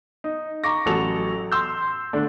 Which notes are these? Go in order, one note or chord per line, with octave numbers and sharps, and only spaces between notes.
D#4
A#5 C#6 D6 A#6
A1 F#3 F#4 A4 F7
C6 E6 G6
D3 A3 D4